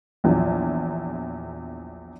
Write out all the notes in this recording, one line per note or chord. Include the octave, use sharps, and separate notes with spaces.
A#1 E2 F3 F#3